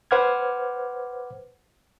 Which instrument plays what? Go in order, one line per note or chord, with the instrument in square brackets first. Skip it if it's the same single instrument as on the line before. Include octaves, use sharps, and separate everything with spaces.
[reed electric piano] B4 C5 F#5 D6 F6 G#6